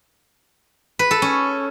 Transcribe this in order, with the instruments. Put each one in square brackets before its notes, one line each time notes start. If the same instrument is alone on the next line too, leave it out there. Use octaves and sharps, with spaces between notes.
[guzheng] B4
A4
C#4